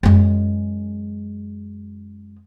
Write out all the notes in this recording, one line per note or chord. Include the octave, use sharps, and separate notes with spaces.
F#2 G#3